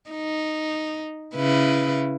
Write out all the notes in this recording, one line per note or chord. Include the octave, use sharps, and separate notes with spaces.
D#4
C#3 E4 B4